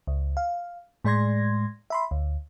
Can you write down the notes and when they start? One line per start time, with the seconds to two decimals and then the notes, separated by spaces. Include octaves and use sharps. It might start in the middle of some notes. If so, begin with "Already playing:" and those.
0.07 C#2
0.37 F5
1.05 A2 G#3 D5 C6 G#6 A#6
1.90 E5 B5 C6
2.11 D2